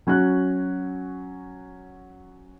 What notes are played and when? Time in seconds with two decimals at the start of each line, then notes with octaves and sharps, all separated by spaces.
0.07 F#3 C#4 F#4 F#6